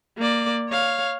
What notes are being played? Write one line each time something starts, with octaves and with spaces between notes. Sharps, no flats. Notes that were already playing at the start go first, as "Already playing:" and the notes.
A#3 D5
C#5 F5